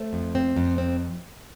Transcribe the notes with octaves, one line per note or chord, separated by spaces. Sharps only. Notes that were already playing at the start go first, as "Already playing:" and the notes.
Already playing: A3 C5
F2
C4
F2
C4